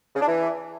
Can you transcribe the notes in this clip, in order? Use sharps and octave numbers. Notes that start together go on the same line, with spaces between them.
C#3
D4
E3